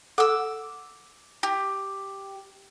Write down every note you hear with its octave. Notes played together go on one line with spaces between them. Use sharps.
A4 F#5 D6 E6
G4